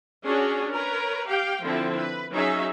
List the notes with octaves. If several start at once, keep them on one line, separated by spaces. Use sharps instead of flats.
C#4 D4 F#4 G#4 C#5
A#4 B4 C#5
G4 F5 G5
D3 F3 C4 E4 A4
B4
F#3 C#4 D#4 G#4 E5